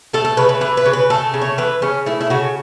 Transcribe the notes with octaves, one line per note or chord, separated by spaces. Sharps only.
A3 A4
A4
C#3 B4
B4
E3 B4
B4
C#3
B4
A3 A4
C#3
C#5
E3 B4
C#3 C#4
A3 E4
E4
C#3 F#4